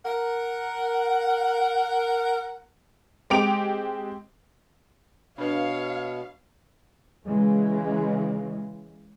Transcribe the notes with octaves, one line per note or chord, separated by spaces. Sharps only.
A#4 F#5
G#3 C4 G4 D6 D7 F7
B2 D4 B4 C#5 F5
C#3 E3 G#3